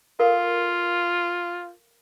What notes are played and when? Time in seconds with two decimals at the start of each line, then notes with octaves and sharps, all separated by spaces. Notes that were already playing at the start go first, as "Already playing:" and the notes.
0.19 F4 A4 A#4 F5